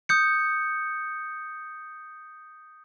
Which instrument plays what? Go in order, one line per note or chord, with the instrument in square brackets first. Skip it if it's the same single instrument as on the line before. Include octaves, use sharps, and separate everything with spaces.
[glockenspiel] D#6 G6 C#7